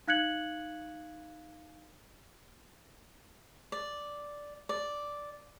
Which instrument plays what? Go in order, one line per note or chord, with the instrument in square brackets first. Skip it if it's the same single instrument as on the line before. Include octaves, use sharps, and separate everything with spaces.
[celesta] D#4 F5 F#6 G#6 C#7 F#7
[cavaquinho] D5
D5